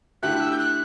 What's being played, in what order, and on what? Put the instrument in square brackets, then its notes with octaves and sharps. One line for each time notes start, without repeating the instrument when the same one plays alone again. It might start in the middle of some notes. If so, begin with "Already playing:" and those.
[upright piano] D3 A3 E4 G4 [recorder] F#6
[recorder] E6
G6
F#6